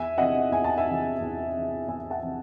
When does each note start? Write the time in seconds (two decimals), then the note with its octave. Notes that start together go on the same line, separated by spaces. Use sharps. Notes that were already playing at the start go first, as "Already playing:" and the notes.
Already playing: E2 E5 G#5
0.18 C3 E3 D#5 F#5
0.51 E2 G#5
0.64 A5
0.78 E5 G#5
0.86 C3 E3
1.21 E2
1.54 C3 E3
1.88 E2 E5 G#5
2.11 F#5 A5
2.22 C3 E3